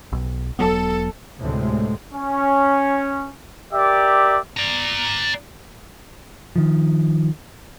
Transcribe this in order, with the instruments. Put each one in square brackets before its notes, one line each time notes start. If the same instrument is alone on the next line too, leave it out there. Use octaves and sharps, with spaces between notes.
[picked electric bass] B1
[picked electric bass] E1 F#3 B3 [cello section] A4
[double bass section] D2 A2 C3 G#3
[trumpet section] C#4
G4 A#4 D5 E5
[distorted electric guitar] D5 A#5
[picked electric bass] D#3 F3